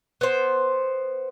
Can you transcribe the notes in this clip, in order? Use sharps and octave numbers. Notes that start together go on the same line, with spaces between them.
B3 C5